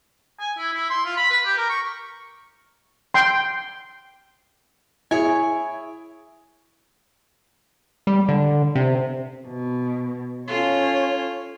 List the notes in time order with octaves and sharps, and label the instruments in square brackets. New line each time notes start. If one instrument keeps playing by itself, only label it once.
[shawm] G#5
E4
E4
C6
F4
B5
B4
G4
A#4
C#6
[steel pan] G5 C6
[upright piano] E4 G#4 [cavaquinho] C#5 G#5
[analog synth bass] G3
D3
C3
[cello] B2
[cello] C#4 C#5 [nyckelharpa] F4 A4